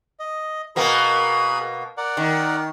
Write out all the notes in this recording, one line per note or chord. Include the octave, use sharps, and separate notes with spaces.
D#5
B2 A#3 B3 G#4 A#4 B5
A#4 D5 F#5
D#3